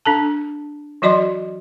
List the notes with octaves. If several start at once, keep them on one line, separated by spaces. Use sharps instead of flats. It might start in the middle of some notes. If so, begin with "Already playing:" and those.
D4 A4 A5
E3 F#3 F#4 D5 D#5 C6